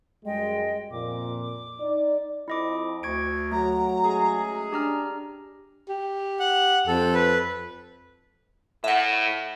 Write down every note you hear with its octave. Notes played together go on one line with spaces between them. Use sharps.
F#2 G3 G#3 D#5 G5
F2 A#2 D6
D#4 D5
F2 E4 D#5 D6
D2 C#6 G#6 D7
F#3 A3 A#5
G#3 C#4 G#4
D4 G4 A#5 F6
G4
F#5
F2 A4
B4
A2 E5 F#5